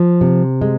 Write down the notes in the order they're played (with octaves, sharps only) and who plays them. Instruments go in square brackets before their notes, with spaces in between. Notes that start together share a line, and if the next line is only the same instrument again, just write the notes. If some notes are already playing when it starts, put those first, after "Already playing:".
Already playing: [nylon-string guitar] F3
C3
G#3